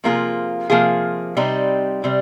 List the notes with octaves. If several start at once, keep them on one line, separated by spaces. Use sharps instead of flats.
C3 F3 A#3 F4 G#4
C3 F3 A#3 F4 G#4
C3 G3 C4 D#4
C3 G3